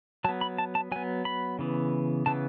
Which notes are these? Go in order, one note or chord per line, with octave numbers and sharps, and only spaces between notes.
F#3 B3 A5
B5
A5
A5
F#3 B3 G#5
B5
C#3 E3 B3
C#3 E3 B3 A5